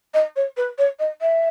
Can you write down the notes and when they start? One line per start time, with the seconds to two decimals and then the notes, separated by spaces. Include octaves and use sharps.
0.14 D#5
0.36 C#5
0.57 B4
0.78 C#5
0.99 D#5
1.21 E5